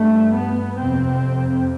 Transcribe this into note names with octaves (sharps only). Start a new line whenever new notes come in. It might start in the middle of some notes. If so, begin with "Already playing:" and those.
Already playing: G2 A3
B3
F2 C3 C4